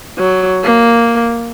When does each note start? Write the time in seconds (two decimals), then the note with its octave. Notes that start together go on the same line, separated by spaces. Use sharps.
0.18 F#3
0.64 A#3